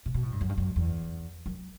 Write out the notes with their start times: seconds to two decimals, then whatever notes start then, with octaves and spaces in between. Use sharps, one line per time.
0.06 C3
0.14 B2
0.23 A2
0.32 G2
0.41 F#2
0.49 G2
0.58 F#2
0.76 E2
1.46 F#2